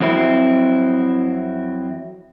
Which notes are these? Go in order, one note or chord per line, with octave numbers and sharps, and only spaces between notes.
F2 F#3 C4 E4